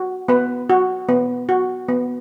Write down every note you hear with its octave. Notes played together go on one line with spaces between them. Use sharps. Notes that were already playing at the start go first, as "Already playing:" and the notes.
Already playing: F#4
B3 B4
F#4
B3
F#4
B3